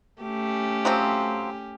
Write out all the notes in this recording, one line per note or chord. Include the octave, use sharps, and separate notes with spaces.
A3 C#4 G4
F3 F#3 C4